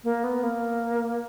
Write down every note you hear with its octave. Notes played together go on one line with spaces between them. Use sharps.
A#3
B3
A#3